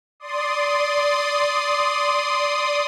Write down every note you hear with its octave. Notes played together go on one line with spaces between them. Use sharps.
D5 C6 D#6